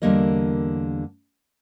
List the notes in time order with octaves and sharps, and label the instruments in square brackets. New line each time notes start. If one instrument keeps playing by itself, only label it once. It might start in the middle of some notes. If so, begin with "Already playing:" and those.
[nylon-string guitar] E2 D3 G3 A#3 A#4 D#5